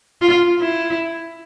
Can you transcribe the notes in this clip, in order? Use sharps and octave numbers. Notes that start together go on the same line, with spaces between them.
F4
E4